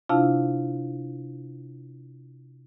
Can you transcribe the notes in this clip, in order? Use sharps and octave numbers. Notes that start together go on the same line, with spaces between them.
C3 D4 E4 F4 F5 A5